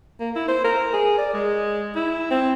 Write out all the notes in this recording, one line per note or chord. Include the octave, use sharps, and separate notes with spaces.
A#3
E4
C5
A#4
G#4
D5
G#3
E4
C4